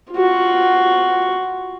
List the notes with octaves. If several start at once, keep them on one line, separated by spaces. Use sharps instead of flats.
F4 F#4